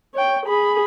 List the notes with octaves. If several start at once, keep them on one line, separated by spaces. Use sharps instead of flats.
C#5 G5
G#4 B5